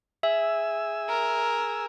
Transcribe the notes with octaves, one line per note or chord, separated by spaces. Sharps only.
G#4 E5 G#5 E6
A#4